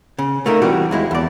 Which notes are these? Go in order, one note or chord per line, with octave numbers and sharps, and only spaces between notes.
C#3
A3 A#3 D#4 A#4
C3 E3 G3 F#4
D#2 G#3 E4
E2 D5